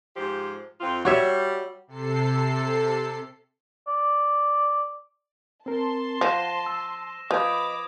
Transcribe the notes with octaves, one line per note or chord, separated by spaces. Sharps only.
G#2 F3 G4
F2 C4 F4
G3 F#4 C#5 E5
C3 A4 C7
D5
C4 A#4 A5 C6
F3 C5 F#5 A#6 D#7 E7
E6
F3 B4 D#5 B5 D6 D#6 G#6